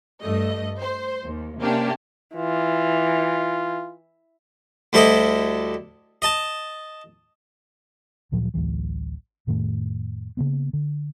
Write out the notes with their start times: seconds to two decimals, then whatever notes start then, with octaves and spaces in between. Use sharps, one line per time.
0.22 G2 A3 D#5
0.79 C5
1.24 D#2
1.61 C3 A#3 C#4 D4 G4
2.35 E3 F4
4.93 D2 G3 E4 A4 D#5
6.22 D#5 A5
8.32 D2 A#2 F3 F#3
8.54 A1 D2 E3 F#3
9.47 F2 A2 D#3 A3
10.37 C#3 A#3 B3
10.73 D3